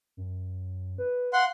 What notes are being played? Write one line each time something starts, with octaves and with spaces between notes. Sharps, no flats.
F#2
B4
F5 F#5 C6